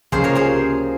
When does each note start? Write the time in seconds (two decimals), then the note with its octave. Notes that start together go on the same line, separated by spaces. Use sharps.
0.12 C#2 C3 F3 A#3 C#4 G#4 C5
0.24 A#4 C#5
0.35 G#4 C5